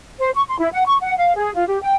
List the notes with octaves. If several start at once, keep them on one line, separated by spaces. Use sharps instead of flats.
C5
C#6
C6
E4
F#5
C#6
F#5
F5
G#4
F4
G4
G5